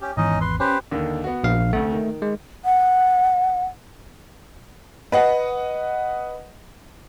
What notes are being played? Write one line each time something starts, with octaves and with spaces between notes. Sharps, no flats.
C#4 G4
G#1 E2 C#4 D#4 D#5
B4 C6
C#4 G4 B4 C5
D#2 D3 D#3
B3 F#4
A#1 F5
D2 C3 A3 F#5
D#3
G#3
F#5
B4 D#5 F#5